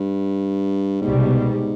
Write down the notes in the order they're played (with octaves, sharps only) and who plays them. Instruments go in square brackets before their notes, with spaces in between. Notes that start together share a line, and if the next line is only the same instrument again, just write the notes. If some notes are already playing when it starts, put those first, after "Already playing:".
Already playing: [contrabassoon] G2
[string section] C2 B2 G3 [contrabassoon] G#2